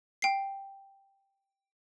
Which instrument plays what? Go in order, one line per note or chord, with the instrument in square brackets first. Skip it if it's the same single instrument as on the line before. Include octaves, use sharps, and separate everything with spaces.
[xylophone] G5 C7